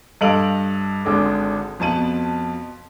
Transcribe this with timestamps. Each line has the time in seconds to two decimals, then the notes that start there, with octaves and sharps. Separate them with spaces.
0.21 G2 A4 D#5 F5 D7 F#7
1.05 G#1 D3 G#3 D4 D6
1.80 F2 B2 A5 D#7 F#7